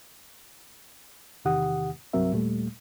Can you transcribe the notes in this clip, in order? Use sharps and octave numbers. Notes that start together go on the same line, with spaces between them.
E2 C3 D#3 G4 F#5 D#6
C2 G2 F#3 C4 A#4 E5
D#2 A#2 G3 A3